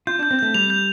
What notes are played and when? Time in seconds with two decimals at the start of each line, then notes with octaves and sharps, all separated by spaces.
0.07 F4 G6
0.19 D4 G6
0.31 C4
0.39 A3 G6
0.54 G3 F7
0.70 G6